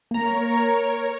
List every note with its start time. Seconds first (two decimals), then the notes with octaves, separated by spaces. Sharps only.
0.11 A#3 A#4 C#5 A#5